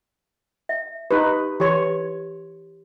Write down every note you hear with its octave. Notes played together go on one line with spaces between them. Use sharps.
E5
D#4 G4 B4
E3 G4 C#5 C6